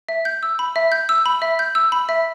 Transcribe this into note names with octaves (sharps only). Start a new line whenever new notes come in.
E5
G6
E6
B5
E5
G6
E6
B5
E5
G6
E6
B5
E5